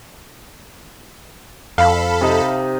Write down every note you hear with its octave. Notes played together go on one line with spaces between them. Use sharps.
F2 A4 F5 B5
C3 D#4